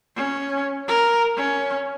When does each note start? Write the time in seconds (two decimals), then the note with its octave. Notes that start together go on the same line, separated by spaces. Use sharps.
0.16 C#4
0.88 A#4
1.36 C#4